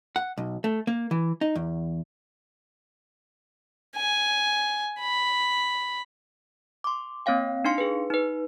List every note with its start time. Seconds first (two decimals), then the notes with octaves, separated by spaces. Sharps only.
0.16 F#5
0.38 B1
0.64 A3
0.87 A#3
1.11 E3
1.41 D#4
1.56 E2
3.96 G#5
5.00 B5
6.84 C6 D6
7.26 A#3 C4 C#5 F5 G5
7.65 D4 D#4 F5 C6 C#7
7.78 G#4 B4
8.10 D#4 B4